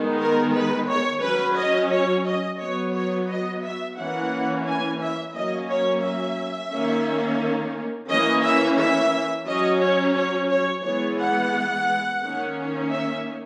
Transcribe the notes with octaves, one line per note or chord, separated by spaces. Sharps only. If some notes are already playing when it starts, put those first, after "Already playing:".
Already playing: D#3 G#3 B3
A#4
B4
C#5
F#3 C#4 B4
D#5
C#5
D#5
F#3 B3 C#5
C#5
D#5
E5
E3 A#3 C#4 F#5
G#5
E5
F#3 A#3 C#4 D#5
C#5
E5
D#3 A#3 C#4
E3 A#3 C#4 D#5
E5
E5
F#3 C#4 D#5
C#5
C#5
C#5
E3 G#3 B3 C#5
F#5
D#3 A#3 C#4
E5